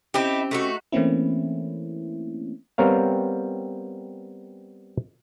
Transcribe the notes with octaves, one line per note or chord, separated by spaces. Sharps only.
C4 C#4 D#4 E4 G4
A3 D#4 F#4
E3 A3 A#3 C4 C#4 E4
G3 B3 C4 A#4 C#5 F5